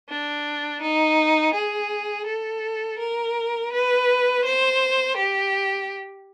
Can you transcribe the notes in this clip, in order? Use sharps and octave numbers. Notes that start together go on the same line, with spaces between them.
D4
D#4
G#4
A4
A#4
B4
C5
G4